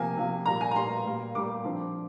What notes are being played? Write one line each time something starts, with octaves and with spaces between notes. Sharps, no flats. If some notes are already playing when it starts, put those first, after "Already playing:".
Already playing: C3 F3 A#3 G#5
C3 F3 A#3
A#2 G3 A#3 A#5
G#5
A#5
A#2 G3 A#3 C6
A#2 G3 A#3
A#2 G3 A#3 D6
D3 F3 C4